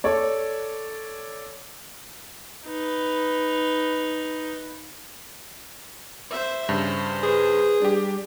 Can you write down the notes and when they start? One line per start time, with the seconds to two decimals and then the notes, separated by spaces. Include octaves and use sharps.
0.04 A4 C#5 D5
2.66 D#4 B4
6.30 C5 E5
6.69 G2 C#3 C5
7.23 G#4 B4
7.82 G3 D4 G4